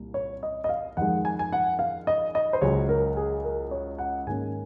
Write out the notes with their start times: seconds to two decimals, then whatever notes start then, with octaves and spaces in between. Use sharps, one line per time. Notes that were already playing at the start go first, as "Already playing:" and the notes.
Already playing: C2 A#2
0.14 C#5
0.43 D#5
0.64 D#5
0.69 F5
0.97 F2 D#3 G#3 F#5
1.25 G#5
1.39 G#5
1.53 F#5
1.79 F5
2.07 D#5
2.35 D#5
2.53 C5
2.61 C#2 C#3 F#3 C#4 C#5
2.89 A#4
3.17 G#4
3.44 A#4
3.71 C#5
3.99 F#5
4.27 G#2 D#3 A#3 C#4 G#5